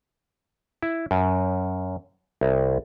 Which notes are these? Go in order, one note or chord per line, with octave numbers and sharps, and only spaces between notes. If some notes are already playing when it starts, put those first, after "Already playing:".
E4
F#2
C2